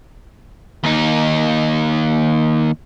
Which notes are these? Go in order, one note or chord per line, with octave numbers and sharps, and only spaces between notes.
D#2 D#4